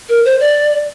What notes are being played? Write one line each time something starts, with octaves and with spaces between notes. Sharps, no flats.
A#4
C5
D5